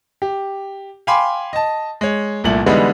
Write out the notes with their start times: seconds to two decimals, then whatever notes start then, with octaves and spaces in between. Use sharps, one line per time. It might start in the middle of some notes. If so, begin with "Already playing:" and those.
0.22 G4
1.07 F5 G5 G#5 B5 C6 D6
1.53 D#5 A5
2.01 G#3 C#5
2.44 C2 A#2 A3 F#7
2.66 D3 E3 G3 G#3 B3 D#4